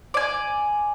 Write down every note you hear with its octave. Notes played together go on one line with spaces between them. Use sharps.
D5 G#5